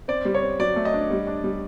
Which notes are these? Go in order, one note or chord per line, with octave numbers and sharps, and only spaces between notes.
C4 D5
G3
C#5
C4
F#3 D5
A3
D#5
D4
G3
D4
G3